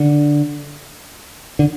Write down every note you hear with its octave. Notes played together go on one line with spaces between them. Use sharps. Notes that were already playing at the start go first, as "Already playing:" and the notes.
Already playing: D3
D3